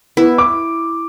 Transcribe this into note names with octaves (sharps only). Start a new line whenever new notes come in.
B3 E4
D6